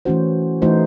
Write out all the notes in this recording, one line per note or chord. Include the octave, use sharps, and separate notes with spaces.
E3 A3 C#4 F#4 C5
E3 A3 D#4 F#4 C5